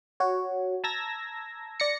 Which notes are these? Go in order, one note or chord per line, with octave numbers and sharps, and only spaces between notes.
F#4 C#5
A5 A#5 E6 G#6 A#6
D5 A#6 C#7